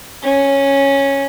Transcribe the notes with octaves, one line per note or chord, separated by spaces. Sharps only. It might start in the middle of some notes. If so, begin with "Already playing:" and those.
C#4